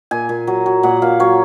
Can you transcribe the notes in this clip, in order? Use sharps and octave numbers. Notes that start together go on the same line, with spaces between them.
A#2 G#5
A#2
F#3
F#3
A#2 F#5
A#2 F5
F#3 C#5